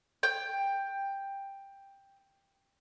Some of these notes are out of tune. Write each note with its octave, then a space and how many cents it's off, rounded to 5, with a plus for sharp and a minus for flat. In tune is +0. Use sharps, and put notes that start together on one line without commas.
G5 +10